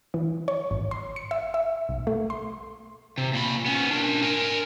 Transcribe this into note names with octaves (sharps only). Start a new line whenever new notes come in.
E3
C#5
G#1
C6
C#7
E5
E5
B1
A3
C6
C3
A#2 B5
B3 C#4
D4 A#4
A#4 G#5